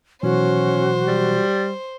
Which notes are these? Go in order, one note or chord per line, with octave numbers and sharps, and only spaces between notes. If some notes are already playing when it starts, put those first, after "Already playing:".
B2 E3 F#3 C#4 F#4 C5
G3